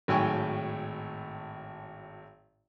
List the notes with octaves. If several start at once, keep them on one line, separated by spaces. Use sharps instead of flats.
G#1 A2 F#3 G5 G#5 C#6